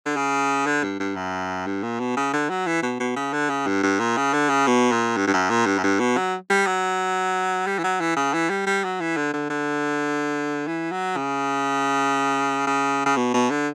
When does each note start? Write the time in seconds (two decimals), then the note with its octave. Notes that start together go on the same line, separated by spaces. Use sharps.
0.06 D3
0.16 C#3
0.66 D3
0.83 G2
1.00 G2
1.16 F#2
1.66 G2
1.83 A#2
2.00 B2
2.17 C#3
2.33 D3
2.50 F#3
2.67 E3
2.83 B2
3.00 B2
3.16 C#3
3.33 D3
3.50 C#3
3.67 G2
3.83 G2
4.00 A#2
4.17 C#3
4.34 D3
4.49 C#3
4.67 B2
4.92 A#2
5.17 G2
5.27 G2
5.34 F#2
5.50 A#2
5.66 G2
5.78 F#2
5.83 G2
6.00 B2
6.17 F#3
6.50 G3
6.67 F#3
7.67 G3
7.79 E3
7.84 F#3
8.00 E3
8.16 C#3
8.34 E3
8.50 G3
8.67 G3
8.84 F#3
9.01 E3
9.17 D3
9.34 D3
9.50 D3
10.67 E3
10.92 F#3
11.17 C#3
12.67 C#3
13.06 C#3
13.17 B2
13.34 B2
13.50 D3